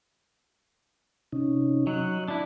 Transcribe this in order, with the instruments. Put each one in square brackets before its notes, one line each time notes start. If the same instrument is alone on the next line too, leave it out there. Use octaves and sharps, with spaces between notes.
[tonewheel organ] C3 C#4 D#4
[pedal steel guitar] F#3 [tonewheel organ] D#5 F#6
[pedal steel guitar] D4 E4